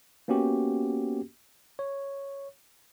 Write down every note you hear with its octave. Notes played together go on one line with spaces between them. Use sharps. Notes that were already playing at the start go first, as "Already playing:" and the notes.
A#3 B3 C#4 F#4 G4
C#5